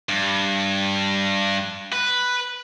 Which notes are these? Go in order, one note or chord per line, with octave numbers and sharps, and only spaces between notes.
G2
B4